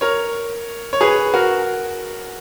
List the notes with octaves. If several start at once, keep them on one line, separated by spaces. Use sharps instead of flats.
A#4 C#5
C#5
G#4 B4
F#4 A#4